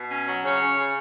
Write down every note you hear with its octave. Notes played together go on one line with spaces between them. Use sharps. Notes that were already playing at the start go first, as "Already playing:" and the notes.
Already playing: B2
C#4
F#3
C#3 C#4 C#5
C#3
C#3